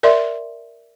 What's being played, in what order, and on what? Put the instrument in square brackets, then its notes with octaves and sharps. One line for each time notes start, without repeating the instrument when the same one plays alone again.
[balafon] A#4 D5 E5 C6